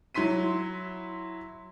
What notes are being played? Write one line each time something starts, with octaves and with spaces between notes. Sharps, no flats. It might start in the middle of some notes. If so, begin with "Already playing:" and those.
F#3 E4 C6 B6 D#7